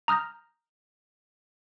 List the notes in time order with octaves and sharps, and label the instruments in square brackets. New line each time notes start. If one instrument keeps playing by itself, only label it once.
[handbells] A#5 D#6 F6 G6 A#6